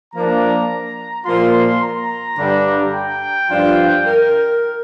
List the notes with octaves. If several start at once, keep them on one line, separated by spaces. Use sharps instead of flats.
F3 A#3 D4 A#5
A#2 F3 A#3 F4 C6
A#5
G2 D3 G3 D4
G5
G2 F3 D4 F4
A#4